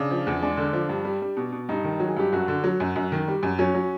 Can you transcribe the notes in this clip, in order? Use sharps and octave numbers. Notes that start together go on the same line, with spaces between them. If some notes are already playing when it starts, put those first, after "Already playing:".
Already playing: C#3 D4
F3
E2
G#3 D4
D3
F3
G2
G3
G3
B2
B2
G2 D#4
D#3
F#3
G#4
G2 G4
F#2 F#4
D3
F#3
F#2
F#2
D#3
G3
F#2
F#3 C#4
F#3